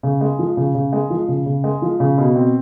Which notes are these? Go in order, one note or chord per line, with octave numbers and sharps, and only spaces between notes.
C#3
G#3
F3
C#3
C#3
G#3
F3
C#3
C#3
G#3
F3
C#3
B2
C4